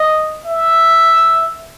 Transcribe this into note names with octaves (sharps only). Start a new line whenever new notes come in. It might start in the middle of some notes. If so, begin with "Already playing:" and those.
Already playing: D#5
E5